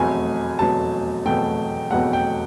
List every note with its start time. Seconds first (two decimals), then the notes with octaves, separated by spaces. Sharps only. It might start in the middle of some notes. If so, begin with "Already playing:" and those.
Already playing: F1 E2 B2 F#3 A3 G#5
0.59 F1 E2 B2 F#3 A3 A5
1.25 F1 E2 B2 F#3 A3 G5
1.91 F1 E2 B2 F#3 A3 F#5
2.13 G5